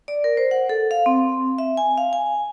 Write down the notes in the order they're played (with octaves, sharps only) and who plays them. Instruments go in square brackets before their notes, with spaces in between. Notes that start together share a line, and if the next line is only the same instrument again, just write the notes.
[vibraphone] D5
A#4
C5
F#5
A4
F5
C4
E5
G#5
F5
G#5